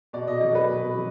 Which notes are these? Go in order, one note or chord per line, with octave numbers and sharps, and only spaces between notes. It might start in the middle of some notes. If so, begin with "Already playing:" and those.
B2 D5
D#5
F#3 D5
B4
B2
F#3